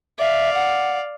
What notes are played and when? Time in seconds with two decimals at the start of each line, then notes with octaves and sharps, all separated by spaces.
0.19 D5 E5 F5
0.54 F#5